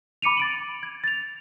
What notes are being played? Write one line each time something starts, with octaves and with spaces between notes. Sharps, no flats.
B5 D6 C#7 D#7 F7
A6 D7 F#7
G#6
A6 F7